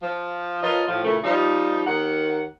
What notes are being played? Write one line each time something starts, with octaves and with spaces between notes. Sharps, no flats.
F3
F3 F4 A#4 B4 C#5 D#5
A2 F3
A#2 C#3 E3 A3
F3 G3 D#4
D#2 D#3 A#3 F#5